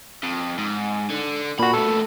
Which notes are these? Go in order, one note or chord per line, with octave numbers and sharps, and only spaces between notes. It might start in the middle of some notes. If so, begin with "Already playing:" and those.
F2
G#2
D3
A#2 F#4 B5
A3 B3 A4